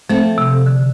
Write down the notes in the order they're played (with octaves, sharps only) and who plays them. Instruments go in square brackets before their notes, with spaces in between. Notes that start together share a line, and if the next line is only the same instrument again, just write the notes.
[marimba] F3 [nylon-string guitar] A3 C4 A4
[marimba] C3
D3